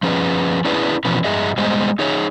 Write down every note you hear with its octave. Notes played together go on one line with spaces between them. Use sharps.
F3 C#4 G#4 B4
C#4 D4 E4 G#4 B4
B2 E3 F3 C#4 B4
G2 G#4 D#5 E5
G3 G#3 B3 G#4 C5 D#5
D#4 G#4 C#5